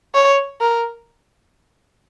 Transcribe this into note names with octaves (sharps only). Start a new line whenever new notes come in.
C#5
A#4